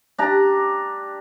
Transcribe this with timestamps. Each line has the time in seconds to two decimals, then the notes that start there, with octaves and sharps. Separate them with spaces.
0.18 D4 G4 A#5